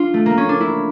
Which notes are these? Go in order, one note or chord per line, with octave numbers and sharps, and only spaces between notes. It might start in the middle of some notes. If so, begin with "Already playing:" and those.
Already playing: D4 F4
A3
A#3
C#4
D4
E4